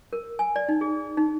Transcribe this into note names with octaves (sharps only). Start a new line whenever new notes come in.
A#4
G#5
D5
D#4
G#4
D#4